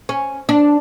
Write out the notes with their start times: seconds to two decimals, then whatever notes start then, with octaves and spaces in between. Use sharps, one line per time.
0.09 C#4
0.49 D4